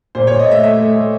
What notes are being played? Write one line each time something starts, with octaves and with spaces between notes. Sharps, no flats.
A#2 C5
A#2 C#5
D#5
A3 E5
A3 E5
A3
A3